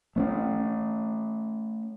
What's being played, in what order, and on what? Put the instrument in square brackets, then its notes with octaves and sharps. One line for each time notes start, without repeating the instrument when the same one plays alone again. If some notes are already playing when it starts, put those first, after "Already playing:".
[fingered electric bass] A3 B3 C#4